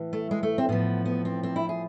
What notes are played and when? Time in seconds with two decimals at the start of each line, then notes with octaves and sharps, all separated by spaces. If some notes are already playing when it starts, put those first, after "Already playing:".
Already playing: A2 E3
0.13 A3
0.31 G#3
0.43 A3
0.58 C4
0.69 A2 F3 B3
1.05 B3
1.25 C4
1.43 C4
1.56 E4
1.69 G#4